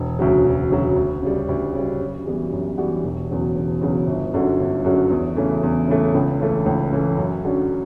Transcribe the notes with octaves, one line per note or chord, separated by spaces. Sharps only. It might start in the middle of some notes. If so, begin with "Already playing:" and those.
Already playing: E1
D2 C#3 F#3
E1
D2 C#3 F#3
D2
C#3 G3
D2
C#3 G3
F#2
E3 G3 B3 F#4
F#2
E3 G3 B3 F#4
E1
E2 C#3 F#3
E1
E2 C#3 F#3
G1
F#2 D3 F#3 C#4
G1
F#2 D3 F#3 C#4
E2
C#3 E3 A3
E2
C#3 E3 A3
C#2
C#3 E3 A3
C#2
C#3 E3 A3
F#2
D3 F#3 C#4